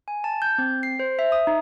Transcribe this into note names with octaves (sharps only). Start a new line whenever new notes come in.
G#5
A5
G6
C4
C7
C5
E5
D#6
D#4